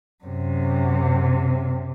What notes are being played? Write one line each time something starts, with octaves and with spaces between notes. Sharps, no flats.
F#2 C3